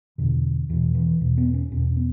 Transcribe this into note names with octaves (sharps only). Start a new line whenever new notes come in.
E2 B2 D3
E2 B2 E3
E3
E2 B2
B3
C#4
E2 B2 C#4
B3